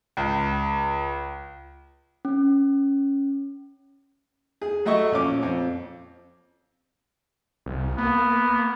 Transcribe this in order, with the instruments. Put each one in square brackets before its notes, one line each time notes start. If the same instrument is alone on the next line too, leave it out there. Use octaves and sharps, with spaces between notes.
[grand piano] C#2
[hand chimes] C#4
[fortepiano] G#4
F#3 A3 D#5 E5 C#6
A#1 C#4 D6
F2
[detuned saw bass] C2
[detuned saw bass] A#3 [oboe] B3